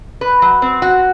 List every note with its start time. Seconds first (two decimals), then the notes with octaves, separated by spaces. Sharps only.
0.21 B4
0.42 F#3
0.62 C4
0.82 F#4